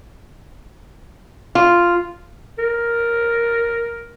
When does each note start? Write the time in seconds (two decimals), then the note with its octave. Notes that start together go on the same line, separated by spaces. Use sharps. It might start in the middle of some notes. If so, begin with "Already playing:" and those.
1.55 F4
2.59 A#4